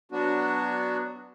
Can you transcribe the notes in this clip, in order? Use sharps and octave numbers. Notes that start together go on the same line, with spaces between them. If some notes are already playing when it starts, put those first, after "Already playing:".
F#3 B3 D4 F#4